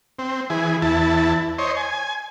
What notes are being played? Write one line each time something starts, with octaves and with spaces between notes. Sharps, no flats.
C4
E3 G#4
E2 E4 A5
C5 C#5 D#5
G#5